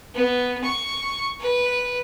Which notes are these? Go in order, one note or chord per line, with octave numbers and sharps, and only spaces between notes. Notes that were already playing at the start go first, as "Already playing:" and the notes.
B3
C#6
B4